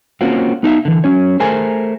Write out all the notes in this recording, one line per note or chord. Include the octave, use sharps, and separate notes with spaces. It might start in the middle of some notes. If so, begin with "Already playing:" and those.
A#3 C4 C#4 F4 F#4
B3 D#4 G4 E5 F5
D3 E3
F#3 C#4 C#5
A3 G#4 A#4 C5 G#5